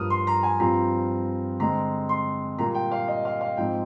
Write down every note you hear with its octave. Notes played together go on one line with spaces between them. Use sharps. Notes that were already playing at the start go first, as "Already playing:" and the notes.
Already playing: G2 F3 A#3 D#6 F6
C6
A#5
G#5
G2 F3 C4 F4 A#5
D3 G#3 C4 A#5
C6
A#2 G3 A#3 F4 A#5
G5
F5
D#5
F5
F5
G#2 F3 C4 D#4 G5